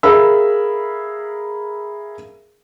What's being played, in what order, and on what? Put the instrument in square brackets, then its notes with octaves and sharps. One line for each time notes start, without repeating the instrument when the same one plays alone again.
[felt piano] G#4 A#4 E5 F5 B5 E6